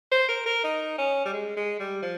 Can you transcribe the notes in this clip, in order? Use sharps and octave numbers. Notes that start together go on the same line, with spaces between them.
C5
A#4
A#4
D#4
C#4
G3
G#3
G#3
G3
F3